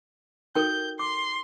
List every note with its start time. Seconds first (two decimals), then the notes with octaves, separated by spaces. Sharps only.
0.55 D#4 F#4 A4 A#4 G5 G6
0.99 C6 D6